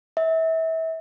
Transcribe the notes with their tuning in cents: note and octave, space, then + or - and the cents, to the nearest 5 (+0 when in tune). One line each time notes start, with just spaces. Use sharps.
E5 -30